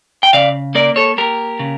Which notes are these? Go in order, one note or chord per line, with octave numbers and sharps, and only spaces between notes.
G5
C#3 D5 F5
A#3 A#4 D5
A4 C#5
A#3 G4 A#4
C#3